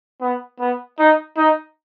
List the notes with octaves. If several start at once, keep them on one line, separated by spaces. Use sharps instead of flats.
B3
B3
D#4
D#4